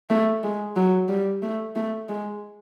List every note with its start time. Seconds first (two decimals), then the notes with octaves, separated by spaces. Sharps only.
0.10 A3
0.43 G#3
0.76 F#3
1.09 G3
1.43 A3
1.76 A3
2.09 G#3